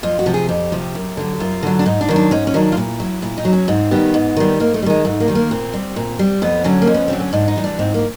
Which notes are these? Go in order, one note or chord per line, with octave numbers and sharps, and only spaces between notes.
F2 F4
F#4
C3 F3
G#4
F2 G4
C3 F3
F#2
D3 F#3
F#2 F4
D3 F#3
D4
G#2 D#4
D4
D#3 F#3
D4
G#2 C#4
C#4
D#3 F#3 D4
F4
A#2 E4
F#3
A#2 E4
D#4
F#3
C#4
G#2 C4
D#3 G3 B3
G#2
D#3 G3
G#2 A#3
A3
G3
D#3 G#3
G#2 A3
A#3
D#3 G3
A#3
A#2 C4
G3
A#2
G3
F2 B3
D3 F#3 C#4
A#3
F2
B3
D3 F#3 C4
C#4
G#2 D4
D#4
E3 G3
D4
G#2 C4
A#3